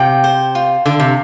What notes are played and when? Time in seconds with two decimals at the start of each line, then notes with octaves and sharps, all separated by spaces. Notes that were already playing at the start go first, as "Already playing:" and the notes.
Already playing: C3 F4 G5
0.24 C5
0.55 F4
0.86 D3 F4
0.99 C3